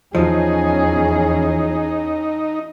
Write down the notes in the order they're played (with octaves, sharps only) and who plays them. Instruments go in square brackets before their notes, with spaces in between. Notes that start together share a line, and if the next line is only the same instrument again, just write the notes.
[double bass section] E2 C#4 [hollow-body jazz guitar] F3 [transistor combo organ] D#4 [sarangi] G#4